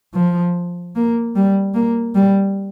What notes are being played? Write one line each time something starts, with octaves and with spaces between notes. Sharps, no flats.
F3
A#3
G3
A#3
G3